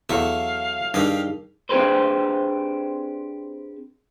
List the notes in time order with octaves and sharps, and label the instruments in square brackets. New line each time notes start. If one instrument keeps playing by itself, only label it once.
[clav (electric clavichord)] E2 [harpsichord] F#3 E4 A4 [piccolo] F5
[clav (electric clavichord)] G2 [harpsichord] G3 G4 D#5 [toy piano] D#4 G#4 A#4
[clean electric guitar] C4 D4 G4 G#4 B4 C5